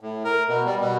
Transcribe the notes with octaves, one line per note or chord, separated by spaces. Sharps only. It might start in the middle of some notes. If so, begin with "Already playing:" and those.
A2
A#4
B2
G3
B2